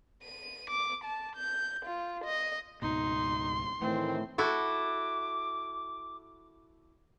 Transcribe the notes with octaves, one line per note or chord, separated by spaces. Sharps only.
D#7
D6
A5
G6
F4
D#5
C#2 G#2 B2 D#4 C6
A2 D#3 E3 A3 C4
E4 F#4 A4 D6